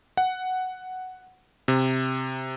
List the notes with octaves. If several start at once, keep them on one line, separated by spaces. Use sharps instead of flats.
F#5
C3